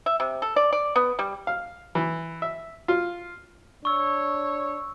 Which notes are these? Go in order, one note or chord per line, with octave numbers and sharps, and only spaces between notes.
E5
C3
A4
D5
D5
B3
G3
F5
E3
E5
F4
D4 C#5 C#6 E6